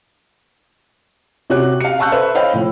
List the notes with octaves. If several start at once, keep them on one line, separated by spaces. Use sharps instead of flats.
C3 F#4 G4 C#5 F#6
F5 C#7
F5 A5 C#6 E6 F#6 G6
A4 B4 C5 E5
C5 C#5 D#5 F5 G5 B5
A2 F3